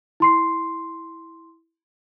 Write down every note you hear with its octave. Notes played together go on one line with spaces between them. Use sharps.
E4 C6 C7